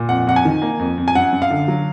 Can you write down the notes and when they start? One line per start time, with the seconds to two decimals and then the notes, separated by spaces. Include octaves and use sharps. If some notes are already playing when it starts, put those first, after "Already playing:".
Already playing: A#2
0.09 F2 F#5
0.27 F2 F#5
0.36 G#5
0.45 D#3
0.62 A#3
0.79 F2
0.98 F2
1.08 G#5
1.15 F#2 F#5
1.33 F#2
1.42 F5
1.50 D3
1.68 F#3